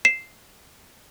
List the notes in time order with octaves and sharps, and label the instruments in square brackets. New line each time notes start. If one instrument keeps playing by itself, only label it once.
[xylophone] C7 E7